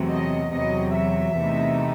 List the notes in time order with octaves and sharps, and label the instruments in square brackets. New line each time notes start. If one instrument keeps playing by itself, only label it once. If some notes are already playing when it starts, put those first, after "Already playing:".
Already playing: [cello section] E2 C3 F#3 A3
D#5
E2 C3 F#3 D#5
E5
E2 C3 E3 A3 D#4